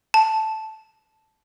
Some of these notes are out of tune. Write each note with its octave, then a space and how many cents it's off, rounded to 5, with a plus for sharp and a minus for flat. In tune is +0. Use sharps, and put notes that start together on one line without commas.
A5 -5